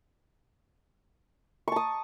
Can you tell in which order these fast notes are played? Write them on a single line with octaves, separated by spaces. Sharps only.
C#6 A5 D#6